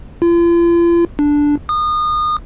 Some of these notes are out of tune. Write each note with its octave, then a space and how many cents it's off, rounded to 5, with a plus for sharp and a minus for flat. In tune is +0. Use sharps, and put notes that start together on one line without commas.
F4 -40
D4 -5
D#6 -30